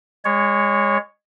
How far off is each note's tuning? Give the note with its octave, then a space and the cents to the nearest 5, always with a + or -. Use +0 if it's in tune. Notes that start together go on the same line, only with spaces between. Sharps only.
G#3 -25 C#5 +0